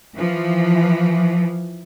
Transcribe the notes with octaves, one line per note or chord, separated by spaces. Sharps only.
E3 F3